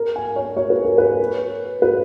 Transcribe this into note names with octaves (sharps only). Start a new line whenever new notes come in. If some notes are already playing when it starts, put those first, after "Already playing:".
Already playing: A#4
G#5
C#5
C#5
B4
A#4
B4
B4